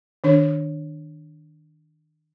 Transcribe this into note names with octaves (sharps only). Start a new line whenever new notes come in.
D#3 D4 C#5